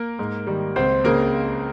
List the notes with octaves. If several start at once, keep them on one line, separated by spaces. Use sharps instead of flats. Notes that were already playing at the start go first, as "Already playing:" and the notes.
Already playing: A#3 A#4
G#2
D#3 G3
C#2 C4 C5
C#3 G#3 A#3 A#4